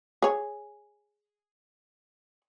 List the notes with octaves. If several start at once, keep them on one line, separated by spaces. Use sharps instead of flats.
G#4 C#5